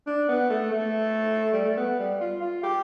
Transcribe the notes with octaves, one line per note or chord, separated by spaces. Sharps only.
D4
B3
A3
A3
G3
A3
B3
G3
F4
F4
G4